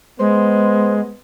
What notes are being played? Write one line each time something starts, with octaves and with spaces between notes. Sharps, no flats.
G#3 B3 C5